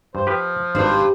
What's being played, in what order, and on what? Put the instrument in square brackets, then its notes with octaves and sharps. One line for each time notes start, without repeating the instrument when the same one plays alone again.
[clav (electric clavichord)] G2 [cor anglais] C5
[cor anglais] F3 [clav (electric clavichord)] G4 B4
[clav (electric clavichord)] G#1 F5 [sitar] G2 [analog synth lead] C5